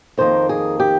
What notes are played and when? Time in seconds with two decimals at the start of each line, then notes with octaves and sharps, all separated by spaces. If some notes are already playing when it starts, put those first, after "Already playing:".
0.17 F2 D#3 A#3 C5
0.49 G#4
0.80 G4